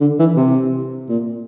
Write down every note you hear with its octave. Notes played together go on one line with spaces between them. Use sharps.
D3
E3
C3
A#2